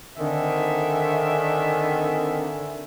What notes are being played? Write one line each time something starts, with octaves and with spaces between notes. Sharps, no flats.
D3 D#3 C4 E5 G#5